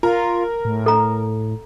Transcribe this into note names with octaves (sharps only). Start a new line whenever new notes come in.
F4 A#4
A2
A4 A#5